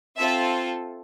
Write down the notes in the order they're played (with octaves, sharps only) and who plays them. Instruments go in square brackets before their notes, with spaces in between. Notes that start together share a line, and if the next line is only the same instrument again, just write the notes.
[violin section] C4 F4 A4 E5